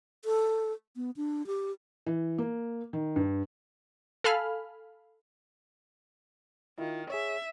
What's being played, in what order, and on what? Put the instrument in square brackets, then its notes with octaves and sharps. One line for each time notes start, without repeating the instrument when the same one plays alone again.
[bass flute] A4
B3
D4
G4
[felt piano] E3
A#3
D#3
G2
[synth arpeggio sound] A4 F5 G#5 B5 F6
[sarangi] D#3 [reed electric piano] E4 F4
[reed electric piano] G#4 C#5 [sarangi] E5